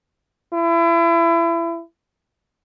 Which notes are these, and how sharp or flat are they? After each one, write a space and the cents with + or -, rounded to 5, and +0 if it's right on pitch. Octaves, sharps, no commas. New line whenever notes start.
E4 +30